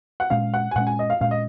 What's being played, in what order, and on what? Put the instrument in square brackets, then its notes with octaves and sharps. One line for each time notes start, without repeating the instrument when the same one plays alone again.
[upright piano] F#5
[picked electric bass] A#2 G#3 C#4 [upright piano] F5
[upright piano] F#5
G#5
[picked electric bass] A#2 G#3 C#4 [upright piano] F#5
[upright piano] G#5
D#5
F5
[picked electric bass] A#2 G#3 C#4 [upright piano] F5
[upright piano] D#5